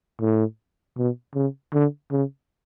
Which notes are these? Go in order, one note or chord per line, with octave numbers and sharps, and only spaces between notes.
A2
B2
C#3
D3
C#3